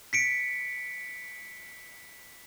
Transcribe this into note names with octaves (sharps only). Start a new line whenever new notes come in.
B6 C#7 D7